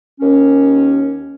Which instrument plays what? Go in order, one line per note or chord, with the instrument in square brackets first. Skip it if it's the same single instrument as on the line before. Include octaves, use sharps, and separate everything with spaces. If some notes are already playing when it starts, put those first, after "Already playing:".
[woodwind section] D#2 C#4